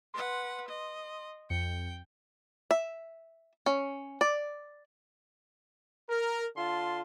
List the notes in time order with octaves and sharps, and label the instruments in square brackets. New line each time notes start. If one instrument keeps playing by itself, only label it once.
[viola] B4 F#5 [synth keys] C6
[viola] D#5
[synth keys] F2 C#7 [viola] G5
[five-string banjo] E5
C#4
D5
[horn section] A#4
D3 F4 A5 C6